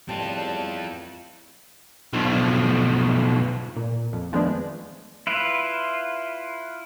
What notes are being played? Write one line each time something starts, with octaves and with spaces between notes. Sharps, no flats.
E2 A2 G3 C4 F4 A5
B1 F3
A#2
F2
D#3 F3 G#3 A3 B3 D4
E4 F4 B4